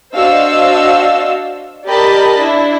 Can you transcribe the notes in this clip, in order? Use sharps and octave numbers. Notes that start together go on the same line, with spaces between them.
D4 F#4 C5 D#5 F5 E6
G4 A#4 D5 D#5 A5 B5
D4 E4